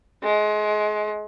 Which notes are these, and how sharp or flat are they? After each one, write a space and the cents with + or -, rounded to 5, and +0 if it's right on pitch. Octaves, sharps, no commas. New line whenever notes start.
G#3 +30